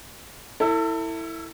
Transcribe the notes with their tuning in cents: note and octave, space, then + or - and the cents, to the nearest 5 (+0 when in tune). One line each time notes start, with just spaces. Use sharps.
E4 -5 A4 +35